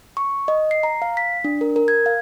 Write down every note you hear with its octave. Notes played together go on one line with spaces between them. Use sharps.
C#6
D#5
C7
A#5
F5
B6
D4
A#4
A#4
G#6
F5